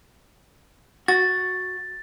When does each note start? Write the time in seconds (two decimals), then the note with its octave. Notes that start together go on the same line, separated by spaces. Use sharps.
1.08 F#4 A6